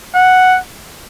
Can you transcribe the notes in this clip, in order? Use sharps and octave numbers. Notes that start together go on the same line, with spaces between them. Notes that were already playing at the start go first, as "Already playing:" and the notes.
F#5